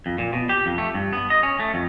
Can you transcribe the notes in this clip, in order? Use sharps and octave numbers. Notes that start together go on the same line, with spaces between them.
F2
A#2
B2
G4
F2
A3
G2
B3
D#5
C#4
A3
F2